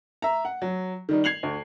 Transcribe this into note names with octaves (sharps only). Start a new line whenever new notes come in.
E5 A#5
F#5
F#3
D#3 G3 D#4
G#6 C7 F7 F#7
D2